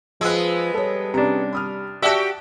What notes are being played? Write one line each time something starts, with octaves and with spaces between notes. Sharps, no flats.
F3 G#3 B3 E6 F#6
G3 A4 C#5
C3 C#4 D4 A#5
B5 D#6 F6
F#4 G4 D5 E5 A5 F#6